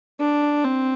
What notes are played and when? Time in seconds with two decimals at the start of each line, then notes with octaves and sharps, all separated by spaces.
0.20 D4
0.64 C4